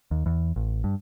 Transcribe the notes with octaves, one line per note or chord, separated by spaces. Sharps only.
D#2
E2
A1
G2